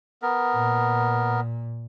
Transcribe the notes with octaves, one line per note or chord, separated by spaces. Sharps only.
B3 A#4
A#2